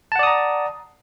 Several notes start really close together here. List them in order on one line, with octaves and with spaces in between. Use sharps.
A5 F#5 D5 D#6 A#5